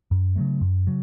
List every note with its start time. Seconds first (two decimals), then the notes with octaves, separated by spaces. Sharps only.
0.11 F#2
0.36 C#3 F#3 A3
0.61 F#2
0.87 C#3 F#3